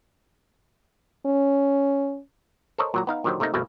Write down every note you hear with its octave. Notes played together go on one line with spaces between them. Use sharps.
C#4
A4 A#4 C5 C#5 D#5
A#2 F#3 A#5
B3 D#4 F5
A#2 D3 D#3 F#3 G4 C5
C3 A3 A#3 D#4
G1 C2 B2 A3 A#3